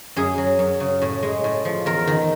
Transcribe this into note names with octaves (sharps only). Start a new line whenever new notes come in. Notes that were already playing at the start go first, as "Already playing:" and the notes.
F#2 G#4
F#3
F#2
C#3
A2
G#3
A2
F3
E2 A#4
D#3